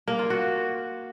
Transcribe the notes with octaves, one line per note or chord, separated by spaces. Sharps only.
A#3
F4
F#4